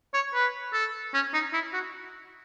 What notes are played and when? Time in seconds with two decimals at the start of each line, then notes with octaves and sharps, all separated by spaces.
0.13 C#5
0.34 B4
0.73 A4
1.13 C#4
1.33 D#4
1.53 E4
1.73 F#4